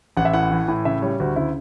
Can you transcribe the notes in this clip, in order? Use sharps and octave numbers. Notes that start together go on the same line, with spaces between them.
A1 F#5
E5
A2 F#5
E3
A2
C#3 E5
G3 C#5
D2 F#4
C#3 E4